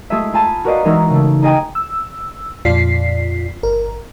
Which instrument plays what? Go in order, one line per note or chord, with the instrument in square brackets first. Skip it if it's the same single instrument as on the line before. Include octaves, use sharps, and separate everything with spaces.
[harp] G#3 A3 F4 G4 G#4 E5
F4 G#5 A5 B5 D#7
F#4 A#4 B4 D5 D#5 F5
E3 G#3 D#4 F#4 A#4 E5
C#3 A3
D#4 G#4 D#5 G5 G#5 A#5
[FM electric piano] E6
F2 A#2 F4 D5 B6 C7
G1 A#4